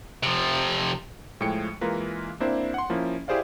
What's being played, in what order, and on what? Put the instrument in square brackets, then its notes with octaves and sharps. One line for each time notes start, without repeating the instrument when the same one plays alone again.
[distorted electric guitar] C3 F3
[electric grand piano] A2 F3 G#3 G5 C#7
E3 G#3 A#3 F4 A#4 B4
A#3 C4 D4 E4 C5
F#5 C6
F3 A#3 C#4 E4
E4 G4 G#4 C5 D5 F5